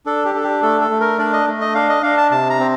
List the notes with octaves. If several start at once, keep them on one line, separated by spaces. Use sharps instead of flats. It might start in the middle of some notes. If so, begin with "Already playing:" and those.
D4 A4
G4
D4 A4
G4
A3 A4
A4
A3
A#4
D4 D5
D#5
A3
D#5
D4 F5
D#5
D4 F5
A5
C3 A5
A#5
C4